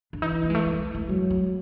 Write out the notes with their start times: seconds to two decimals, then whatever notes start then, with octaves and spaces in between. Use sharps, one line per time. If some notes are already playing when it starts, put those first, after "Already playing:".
0.13 D4
0.22 E3 D#4
0.32 D4
0.43 A#3
0.50 G#3
0.55 A3
0.66 G#3
0.79 A3
0.95 A3
1.08 F#3 G#3
1.30 A3